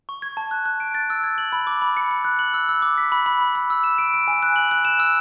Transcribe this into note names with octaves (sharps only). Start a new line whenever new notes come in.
C#6
G#6
A5
F#6
F#6
D7
A6
E6
G#6
F#7
B5
D6
B5
C#7
C#7
F#6
F#7
E6
E6
D6
B6
B5
B5
B5
B5
E6
E7
D7
D7
G#5
F#6
F#7
F#6
E7
E6